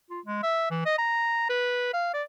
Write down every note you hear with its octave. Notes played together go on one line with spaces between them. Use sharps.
F4
G#3
E5
E3
D#5
A#5
B4
F5
D5